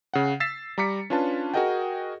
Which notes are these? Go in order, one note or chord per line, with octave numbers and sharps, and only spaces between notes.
C#3 F#5
E6 A6 B6 C7 E7
G3 A#5 D6 B6 C#7
C#4 D4 F4 B4 A5
F#4 G#4 A#4 D#5 F#5 G5